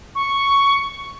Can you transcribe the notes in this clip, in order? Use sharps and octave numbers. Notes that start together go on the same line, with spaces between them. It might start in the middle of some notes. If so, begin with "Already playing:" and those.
C#6